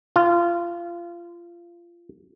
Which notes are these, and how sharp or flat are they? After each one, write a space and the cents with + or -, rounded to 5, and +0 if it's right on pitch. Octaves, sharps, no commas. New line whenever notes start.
F4 -25